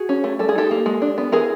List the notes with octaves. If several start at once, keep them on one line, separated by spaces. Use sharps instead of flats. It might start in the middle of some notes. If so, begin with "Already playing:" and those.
Already playing: F#4 G#4
C#4
A3
G3 A4
G#4
D#4 G4 A4
A#3
G#3
D4
B3
E3 G#4 A#4